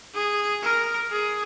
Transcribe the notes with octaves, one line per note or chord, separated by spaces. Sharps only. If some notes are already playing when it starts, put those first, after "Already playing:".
G#4
A#4
G#4